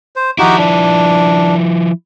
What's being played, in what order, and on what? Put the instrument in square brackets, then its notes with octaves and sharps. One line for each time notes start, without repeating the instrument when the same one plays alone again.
[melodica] C5
[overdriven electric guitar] F3 E4 [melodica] D#4 F#4 G4
[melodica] D4